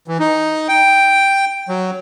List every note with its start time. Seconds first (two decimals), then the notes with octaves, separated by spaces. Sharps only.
0.08 E3
0.19 D#4
0.68 G5
1.68 F#3